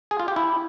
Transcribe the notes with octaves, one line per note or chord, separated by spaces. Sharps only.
G#4
F4
G4
E4